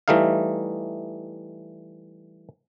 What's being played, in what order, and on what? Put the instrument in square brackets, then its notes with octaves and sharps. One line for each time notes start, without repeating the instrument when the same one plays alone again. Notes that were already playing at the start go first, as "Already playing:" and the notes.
[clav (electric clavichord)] E3 G3 A3 D#4 F5